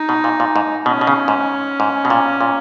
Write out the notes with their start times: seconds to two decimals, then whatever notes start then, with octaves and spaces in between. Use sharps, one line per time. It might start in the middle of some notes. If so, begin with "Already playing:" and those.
Already playing: D#4
0.09 B2
0.24 A#2
0.40 A#2
0.56 G#2
0.86 B2 C#4
1.01 B2
1.07 C#3
1.28 G#2
1.80 G#2
2.05 B2
2.10 A#2
2.41 A#2